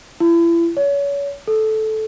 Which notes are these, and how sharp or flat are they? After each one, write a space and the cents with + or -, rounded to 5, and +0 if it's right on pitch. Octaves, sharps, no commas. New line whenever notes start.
E4 +35
C#5 +35
A4 -15